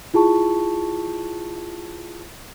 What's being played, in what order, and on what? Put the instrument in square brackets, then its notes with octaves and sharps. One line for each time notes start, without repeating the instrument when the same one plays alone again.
[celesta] E4 F4 G#4 A5 C#6